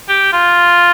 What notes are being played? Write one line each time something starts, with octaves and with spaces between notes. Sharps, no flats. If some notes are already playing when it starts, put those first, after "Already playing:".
G4
F4